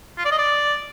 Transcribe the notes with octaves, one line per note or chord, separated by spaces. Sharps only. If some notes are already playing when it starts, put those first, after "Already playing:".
F4
D5
D#5
D5